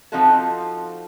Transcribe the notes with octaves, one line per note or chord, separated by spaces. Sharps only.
F3 C4 D#4 F4 F#4 A4